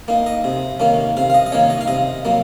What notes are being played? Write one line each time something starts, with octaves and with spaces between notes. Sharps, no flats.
A#3 D#4
D#5
C3
D#3 A#3 C#4
C3 F5
F5
D#5
D#5
D#3 A#3 C#4 C#5
D#5
F5
C3 D#5
F#3 A#3